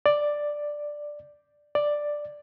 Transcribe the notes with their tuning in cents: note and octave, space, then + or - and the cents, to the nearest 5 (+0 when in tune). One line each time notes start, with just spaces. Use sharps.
D5 +5
D5 +5